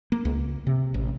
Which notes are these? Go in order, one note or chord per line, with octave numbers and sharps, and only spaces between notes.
A#3
C#2
C3
A1